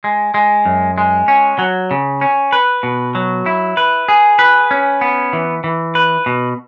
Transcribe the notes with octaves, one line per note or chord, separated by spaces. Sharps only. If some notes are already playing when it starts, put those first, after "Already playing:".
G#3
G#3
F#2
G#3
C#4
F#3
C#3
C#4
B4
B2
F#3
E4
B4
G#4
B4
C#4
B3
E3
E3
B4
B2